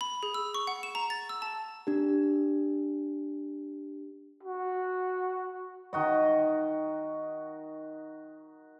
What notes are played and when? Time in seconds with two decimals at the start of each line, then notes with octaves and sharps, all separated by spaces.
0.01 B5
0.23 G#4
0.34 E6
0.54 C#6
0.67 F#5
0.83 E7
0.95 A#5
1.10 A6
1.29 E6
1.42 A5
1.87 D4 G4
4.43 F#4
5.93 D#3 F#4 D#5